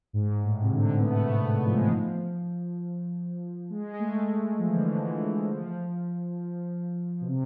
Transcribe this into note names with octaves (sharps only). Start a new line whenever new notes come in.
G#2
A2
C3
D3
B3
A3
A3
B3
B3
F3
G#3
E3
F3
G#3
G#3
A3
F3
E3
D3
E3
E3
F3
B2
C3